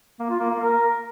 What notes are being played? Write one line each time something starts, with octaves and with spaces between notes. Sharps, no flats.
A#3
F4
A#3
A#3
A#4